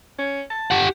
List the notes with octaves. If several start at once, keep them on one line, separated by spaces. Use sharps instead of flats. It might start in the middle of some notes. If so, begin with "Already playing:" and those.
C#4
A5
G4 F#5